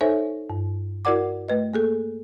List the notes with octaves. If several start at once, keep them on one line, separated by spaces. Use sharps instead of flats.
D#4 A4 C5 C#5 E5 G#5
G2
E4 F#4 A#4 D5 F#5 D6
A3 B4 D#5
A#3 G#4 A4